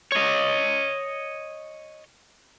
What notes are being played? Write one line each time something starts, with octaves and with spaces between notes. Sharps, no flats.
C#5 D#5